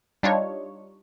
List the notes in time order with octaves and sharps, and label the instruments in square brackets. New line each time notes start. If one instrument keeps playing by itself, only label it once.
[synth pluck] G3 D4 D#4 F4 C#5